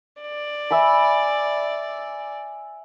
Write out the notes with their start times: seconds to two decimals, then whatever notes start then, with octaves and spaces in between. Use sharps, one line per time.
0.21 D5
0.71 E5 G#5 B5